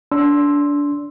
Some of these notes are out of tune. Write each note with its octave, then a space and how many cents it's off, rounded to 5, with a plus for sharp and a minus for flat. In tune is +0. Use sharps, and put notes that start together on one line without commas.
D4 -25 C6 +0 E6 +0